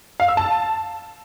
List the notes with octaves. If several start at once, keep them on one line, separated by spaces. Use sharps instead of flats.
F5
E6
A5